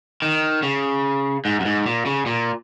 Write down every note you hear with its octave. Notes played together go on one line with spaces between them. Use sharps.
D#3
C#3
G#2
F#2
G#2
A#2
C#3
A#2